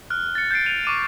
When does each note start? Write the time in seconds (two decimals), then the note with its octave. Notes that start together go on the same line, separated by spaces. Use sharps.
0.10 F6 F#6
0.35 A6 C#7
0.51 G6 A6 C7 D7
0.66 D#7 F7
0.85 C#6 D6 D#7